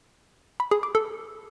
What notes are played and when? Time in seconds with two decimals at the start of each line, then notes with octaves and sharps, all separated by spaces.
0.60 B5
0.71 G#4
0.83 D6
0.95 A4